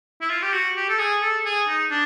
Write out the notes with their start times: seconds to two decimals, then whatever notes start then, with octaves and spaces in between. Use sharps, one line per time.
0.21 E4
0.30 F4
0.42 G4
0.53 F#4
0.76 G4
0.89 A4
0.99 G#4
1.22 A4
1.45 G#4
1.68 D#4
1.90 D4